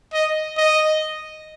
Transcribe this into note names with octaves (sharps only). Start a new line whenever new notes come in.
D#5
D#5